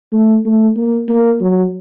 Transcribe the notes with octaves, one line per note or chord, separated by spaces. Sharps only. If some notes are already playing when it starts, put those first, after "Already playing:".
A3
A3
A#3
A#3
F#3